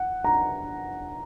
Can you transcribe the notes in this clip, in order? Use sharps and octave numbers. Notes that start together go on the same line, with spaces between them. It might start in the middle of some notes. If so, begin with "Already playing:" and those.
Already playing: F#5
A#5